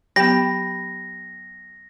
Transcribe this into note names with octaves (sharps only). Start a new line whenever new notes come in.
F#3 B3 G4 B5 A#6